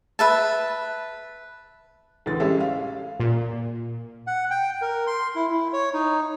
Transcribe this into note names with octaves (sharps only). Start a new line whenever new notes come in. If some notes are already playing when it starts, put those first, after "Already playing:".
B4 E5 A5
A1 D2 B4 A6
G3 G#3 C#4 G4 A4 E5
F5
A#2
F#5
G5
A#4
C6
E4
E4
C#5
D#4